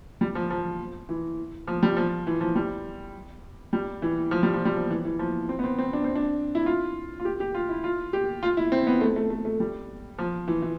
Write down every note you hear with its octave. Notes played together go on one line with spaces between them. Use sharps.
G3
F3
F3
E3
F3
G3
F3
E3
F3
G3
G3
E3
F3
G3
F3
G3
F3
E3
E3
F3
C4
B3
C4
C4
D4
C4
D4
E4
F4
F4
G4
G4
F4
E4
F4
G4
F4
E4
C4
B3
A3
A3
A3
A3
G3
F3
E3
E3